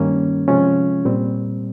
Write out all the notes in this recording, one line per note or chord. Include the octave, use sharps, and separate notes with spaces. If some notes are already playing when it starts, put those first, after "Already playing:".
Already playing: G2 D#3 G3 A#3 C#4
C3 F3 G#3 C#4 F4
A#2 G3 C4